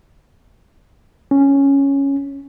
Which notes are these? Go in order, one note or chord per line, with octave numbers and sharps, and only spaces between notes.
C#4